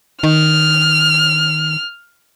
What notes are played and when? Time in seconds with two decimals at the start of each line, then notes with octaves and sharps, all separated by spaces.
0.23 D#3 F6